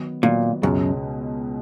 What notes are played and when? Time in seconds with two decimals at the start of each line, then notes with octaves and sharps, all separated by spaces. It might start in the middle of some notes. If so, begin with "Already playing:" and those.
Already playing: D#3 F#3 B3
0.23 A#2 D#3 F#3 B3
0.62 C#2 F#2 B2 G#3 C#4